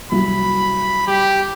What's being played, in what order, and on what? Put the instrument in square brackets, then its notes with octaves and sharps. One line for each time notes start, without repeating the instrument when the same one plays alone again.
[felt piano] C2 F#3 [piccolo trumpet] B5
[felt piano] G3 [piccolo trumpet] G4